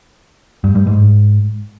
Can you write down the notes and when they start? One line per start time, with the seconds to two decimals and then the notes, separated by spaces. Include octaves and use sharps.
0.64 G2
0.75 G2
0.87 G#2